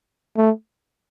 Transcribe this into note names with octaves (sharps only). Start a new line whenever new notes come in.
A3